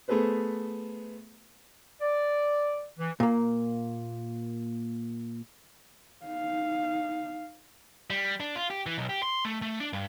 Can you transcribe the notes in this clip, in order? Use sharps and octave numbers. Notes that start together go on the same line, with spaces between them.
A3 B3 G#4 A4 B4 C5
D5
E3
A#2 A#3
D#4 F5
G3
D4
F4
G4
E3
B1
G4
C6
A3
A3
D4
G2